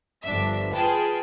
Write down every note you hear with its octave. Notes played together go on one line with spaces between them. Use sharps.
G1 F3 D4 E5
F4 G#4 B4 G5 A5